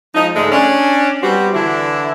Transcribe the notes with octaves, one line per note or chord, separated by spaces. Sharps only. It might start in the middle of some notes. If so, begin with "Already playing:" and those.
F3 G#3 D#4
G#2 D3 G#3 A3
C#4 D4
G3 B3 C4 F#4 G4
D3 E3 D4 E4